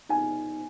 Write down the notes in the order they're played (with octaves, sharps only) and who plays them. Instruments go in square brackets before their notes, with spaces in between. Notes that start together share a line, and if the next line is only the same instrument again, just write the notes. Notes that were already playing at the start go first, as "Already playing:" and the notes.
[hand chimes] D#4 [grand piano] G#5